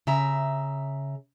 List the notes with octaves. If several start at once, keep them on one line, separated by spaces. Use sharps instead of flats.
C#3 E5 A#5